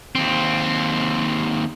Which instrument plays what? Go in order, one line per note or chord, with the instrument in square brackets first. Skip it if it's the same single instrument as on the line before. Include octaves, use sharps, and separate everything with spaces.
[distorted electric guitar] D#2 C4